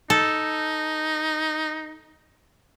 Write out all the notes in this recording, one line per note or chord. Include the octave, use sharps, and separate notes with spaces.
D#4 A4